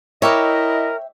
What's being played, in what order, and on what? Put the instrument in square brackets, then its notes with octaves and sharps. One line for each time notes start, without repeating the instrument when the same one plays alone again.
[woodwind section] E4 D#5 [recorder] A#4 [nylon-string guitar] C#5 [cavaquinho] E5 G5 D6